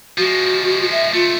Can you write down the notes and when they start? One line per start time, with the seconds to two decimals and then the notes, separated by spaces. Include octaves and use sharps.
0.18 F3 G#3 F#4
0.91 E5
1.13 C#2 A3 F4